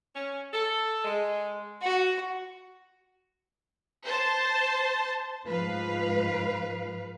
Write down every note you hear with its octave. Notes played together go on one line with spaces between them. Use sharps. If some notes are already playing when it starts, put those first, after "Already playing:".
C#4
A4
G#3
F#4
C5 A5
G#2 F3 B4 F5